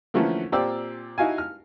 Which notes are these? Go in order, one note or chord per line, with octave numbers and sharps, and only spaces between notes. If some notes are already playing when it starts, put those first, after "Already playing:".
D3 E3 F3 A3 A#3 C#4
A#2 C4 G4 D5 E6
D#4 E4 F#4 F5 G#5
F6